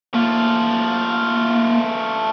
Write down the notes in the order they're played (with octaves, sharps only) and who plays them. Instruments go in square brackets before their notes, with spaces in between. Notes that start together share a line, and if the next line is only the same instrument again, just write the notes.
[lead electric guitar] A3 F4 [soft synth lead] A#3